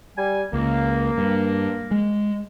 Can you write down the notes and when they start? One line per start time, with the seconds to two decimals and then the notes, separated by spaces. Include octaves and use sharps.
0.17 G3 G#5
0.53 C#2 A#3
1.18 G2
1.91 G#3